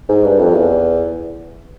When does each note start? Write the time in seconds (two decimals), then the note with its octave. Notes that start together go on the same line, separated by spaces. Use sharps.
0.09 G#2
0.24 G2
0.39 F2
0.55 E2